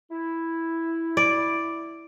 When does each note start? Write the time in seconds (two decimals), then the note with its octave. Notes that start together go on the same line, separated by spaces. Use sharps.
0.11 E4
1.17 D5